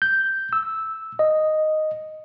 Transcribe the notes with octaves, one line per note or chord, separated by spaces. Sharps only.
G6
E6
D#5